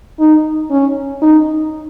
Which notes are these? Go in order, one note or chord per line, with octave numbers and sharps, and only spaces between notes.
D#4
C#4
D#4